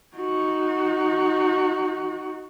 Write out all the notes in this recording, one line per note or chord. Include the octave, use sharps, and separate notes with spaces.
D#4 F#4